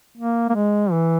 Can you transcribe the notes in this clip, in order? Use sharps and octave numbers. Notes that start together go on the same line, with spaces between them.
A#3
A#3
G#3
E3